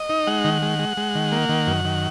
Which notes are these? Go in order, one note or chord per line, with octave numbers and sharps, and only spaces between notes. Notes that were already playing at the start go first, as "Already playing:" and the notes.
Already playing: D#5
D#4
G#3 F#5
D#3
G#3
G#3
G#3
D#3
A#3
D#3
F#2
D#3